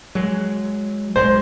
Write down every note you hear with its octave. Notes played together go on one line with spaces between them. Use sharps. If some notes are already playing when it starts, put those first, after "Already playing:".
F#3 G#3
B1 G#2 G#3 C5